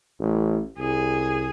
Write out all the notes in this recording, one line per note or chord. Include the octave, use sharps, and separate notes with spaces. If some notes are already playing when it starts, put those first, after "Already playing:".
A1
C2 G#4